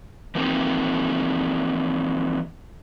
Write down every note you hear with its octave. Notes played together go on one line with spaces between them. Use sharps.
E3 F3 A#3 C4 D#4 F4